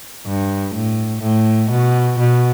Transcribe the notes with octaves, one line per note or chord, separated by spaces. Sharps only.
G2
A2
A2
B2
B2